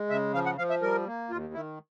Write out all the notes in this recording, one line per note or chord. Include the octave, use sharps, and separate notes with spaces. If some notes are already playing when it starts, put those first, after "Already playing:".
Already playing: G#3
C#3 E5
F3 F5
F#5
F3 F5
E5
G3 A#4
A#3
D#2 F4
D#3 E4